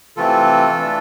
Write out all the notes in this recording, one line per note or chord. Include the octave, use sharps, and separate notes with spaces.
C3 E3 A3 C4 F4 A4
E3 A3 D4